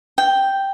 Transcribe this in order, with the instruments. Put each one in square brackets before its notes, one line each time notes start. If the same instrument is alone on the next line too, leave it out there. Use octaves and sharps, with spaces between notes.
[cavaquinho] G5